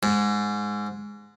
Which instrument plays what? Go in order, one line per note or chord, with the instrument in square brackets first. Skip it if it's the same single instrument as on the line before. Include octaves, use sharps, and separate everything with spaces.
[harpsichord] G#2